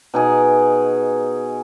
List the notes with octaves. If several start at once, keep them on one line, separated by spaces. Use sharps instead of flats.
B2 D#4 G#4